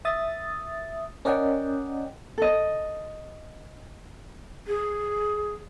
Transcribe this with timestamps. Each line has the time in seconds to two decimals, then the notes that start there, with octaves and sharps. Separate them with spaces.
0.05 E5 D#6 A6
1.25 C#4 A#4 D5 D#5 F#5 G5
2.38 A4 D#5
4.67 G#4